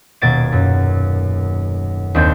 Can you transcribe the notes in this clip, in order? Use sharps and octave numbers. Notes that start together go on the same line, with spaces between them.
D#1 B2 A#3 G#6 A6 D7
F#2
D#2 C4 D4 G6